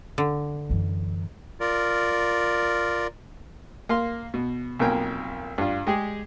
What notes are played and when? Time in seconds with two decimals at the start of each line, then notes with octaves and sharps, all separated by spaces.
0.18 D3
0.69 F#2 E3
1.60 F4 A#4 D5
3.89 A#3 F5 C6
4.34 B2
4.79 B1 F2 A#3 A#4 G5 G#5
5.58 G2 F4
5.87 G#3 G4 G#4